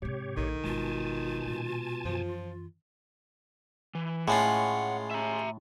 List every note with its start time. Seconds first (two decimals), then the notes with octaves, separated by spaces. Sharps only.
0.02 G#2 C3 G4 C#5
0.37 A#1 D#3 A4
0.64 G1 B2 G#3 F4 G#5 A5
1.46 A#2 G#3
2.05 F#2 E3 F3
3.95 E3
4.28 A2 G#3 C#4 F4 F#5
5.11 E5 A#5